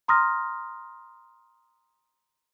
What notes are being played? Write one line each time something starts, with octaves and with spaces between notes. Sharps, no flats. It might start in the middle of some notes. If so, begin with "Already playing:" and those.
A#5 C6 D#6 F6 A#6